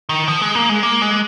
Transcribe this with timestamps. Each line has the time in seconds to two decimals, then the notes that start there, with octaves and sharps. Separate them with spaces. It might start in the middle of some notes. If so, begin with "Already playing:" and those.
0.09 D#3
0.28 F3
0.41 G#3
0.55 A#3
0.69 G#3
0.83 A#3
1.02 G#3